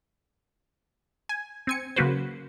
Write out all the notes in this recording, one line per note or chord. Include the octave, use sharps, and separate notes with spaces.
G#5
C4 G#5 C#7
C#3 F#3 A#3 F#4 B4 C5